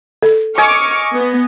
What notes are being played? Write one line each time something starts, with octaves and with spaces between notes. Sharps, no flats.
A4
D#5 G#5 C#6 D6 F6
B3